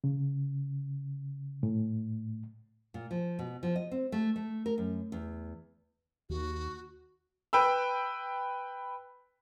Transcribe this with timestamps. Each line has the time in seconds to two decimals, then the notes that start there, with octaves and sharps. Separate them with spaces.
0.04 C#3
1.63 A2
2.94 A#2
3.11 F3
3.39 B2
3.63 F3
3.76 D#5
3.91 C4
4.12 A3
4.36 A3
4.66 A#4
4.78 F#2
5.12 E2
6.30 D#2 F#4
7.53 B4 G5 B5 E6